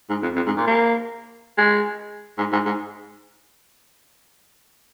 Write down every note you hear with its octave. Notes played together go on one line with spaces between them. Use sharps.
G#2
F2
F2
G#2
A#2
A#3
G#3
G#2
G#2
G#2